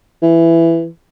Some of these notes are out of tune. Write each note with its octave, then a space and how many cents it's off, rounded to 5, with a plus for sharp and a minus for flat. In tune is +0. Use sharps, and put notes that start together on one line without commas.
E3 +10